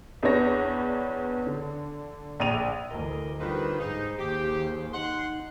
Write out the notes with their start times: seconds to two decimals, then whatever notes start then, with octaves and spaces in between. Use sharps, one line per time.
0.23 E2 B3 D4 C#5 A#6
1.46 D3
2.40 A#1 D5 D#7 F7
2.91 D2 E3 A#4 D#5
3.40 D3 D#3 G3 F4 B4 C5
3.80 G#2 D#4 G#4 C5
4.19 D#2 G4
4.94 D#4 F#5 C6